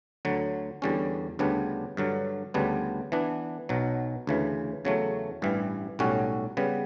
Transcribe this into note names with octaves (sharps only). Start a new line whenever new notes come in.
D2 D3 F#3
E2 D3 G3 C#4
D2 C#3 G3 B3 D4
G2 D3 F#3
D2 C#3 G3 B3 D4
E3 B3 D4
B1 B2 F#3
D2 C#3 E3
E2 C#3 F#3 A3
A1 G2 E3 G3
B1 A2 G3 C#4 F#4
C#3 G3 B3